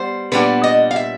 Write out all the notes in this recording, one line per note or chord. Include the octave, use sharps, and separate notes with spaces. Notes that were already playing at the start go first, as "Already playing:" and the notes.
Already playing: G3 B3 C5
A#2 G3 B3 D4 B4
D#5
F5
E5